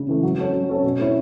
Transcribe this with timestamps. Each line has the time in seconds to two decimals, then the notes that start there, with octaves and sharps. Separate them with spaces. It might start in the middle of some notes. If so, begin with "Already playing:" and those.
Already playing: C#3
0.09 E3 A3
0.23 F#3
0.38 C#4 A4 C#5
0.53 F#3
0.69 C#4 A4 C#5
0.84 B2
0.99 A3 C#4 E4 C#5